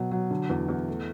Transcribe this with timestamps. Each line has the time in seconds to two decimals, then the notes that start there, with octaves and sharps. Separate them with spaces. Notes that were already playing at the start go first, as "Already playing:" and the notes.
Already playing: B2 F#3
0.11 F#3
0.31 D3
0.50 E2
0.68 E2
0.88 A3